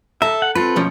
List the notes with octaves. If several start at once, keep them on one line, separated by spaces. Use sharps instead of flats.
A4 E5 A#5
F#5
C4 F4 A4 B4
B1 F3 C#4